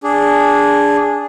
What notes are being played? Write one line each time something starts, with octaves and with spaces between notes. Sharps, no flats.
D4 G#4